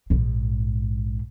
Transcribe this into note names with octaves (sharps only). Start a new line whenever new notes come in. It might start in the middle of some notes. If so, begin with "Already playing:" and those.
A#1 G#2